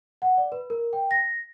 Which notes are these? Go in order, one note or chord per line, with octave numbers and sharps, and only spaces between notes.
F#5
D5
B4
A#4
G5
A#6